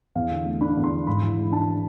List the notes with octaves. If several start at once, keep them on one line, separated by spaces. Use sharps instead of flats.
E2 F5
D3
A3
D4 B5
E2
C6
D3
G#2 B5
E3
G#3
D4 A5